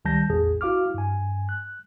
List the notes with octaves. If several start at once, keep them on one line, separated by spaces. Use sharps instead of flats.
C#2 D#3 G3 A5 G6 A#6
A1 E2 A2 G#4
E4 F#4 F5 D6 F6
G2 G#5
F#6